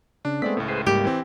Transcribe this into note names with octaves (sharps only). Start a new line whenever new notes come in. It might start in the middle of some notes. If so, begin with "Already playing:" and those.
C#3 D4
G#3 A3 B3 C4 D5 B6
C#2 A2
G#4 B4 C5
G#2 G3 A#3 G4
E3 C4